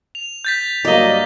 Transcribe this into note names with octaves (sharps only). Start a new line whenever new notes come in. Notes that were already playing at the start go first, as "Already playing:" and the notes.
F7
G6 A6 B6
G2 F#3 A#3 F#4 D5 D#5